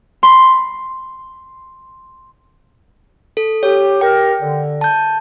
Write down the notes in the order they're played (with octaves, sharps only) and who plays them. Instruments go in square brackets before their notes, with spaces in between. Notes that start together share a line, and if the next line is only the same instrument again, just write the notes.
[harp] B5 C6
[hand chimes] A4
[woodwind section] G4 [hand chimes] C#5
[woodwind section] G4 A#4 [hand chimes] G5
[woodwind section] D3
[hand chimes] A5 G6